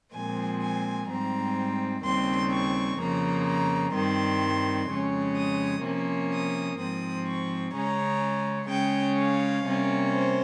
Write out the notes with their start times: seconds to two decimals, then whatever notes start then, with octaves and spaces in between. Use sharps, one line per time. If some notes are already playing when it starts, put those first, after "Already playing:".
0.14 A#2 F3 G#3 C4 G#5
0.61 G#5
1.09 G#2 G3 C4 A#5
2.04 D#2 C#3 G3 C4 C6
2.52 C#6
2.99 F2 C#3 F3 A#3 A#5
3.47 A#5
3.94 G2 D#3 G3 C4 C6
4.89 F2 C#3 G#3 C#4
5.38 D#6
5.85 C3 F3 A#3 C#4
6.33 D#6
6.79 G#2 F3 C4 D#6
7.27 C#6
7.75 C#3 G#3 C#4 A#5
8.70 C#3 G#3 C#4 G5
9.18 F5
9.66 C3 G3 A#3 C#4
10.13 C5